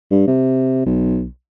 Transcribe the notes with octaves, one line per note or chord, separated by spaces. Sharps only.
G2
C3
B1